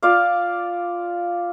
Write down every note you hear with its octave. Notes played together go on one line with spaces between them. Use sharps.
F4 D5 F5